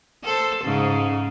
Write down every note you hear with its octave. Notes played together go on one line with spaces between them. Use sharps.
A4 C5
G#2 C#3